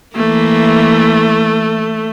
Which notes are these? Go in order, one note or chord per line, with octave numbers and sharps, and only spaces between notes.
E3 A3 A#3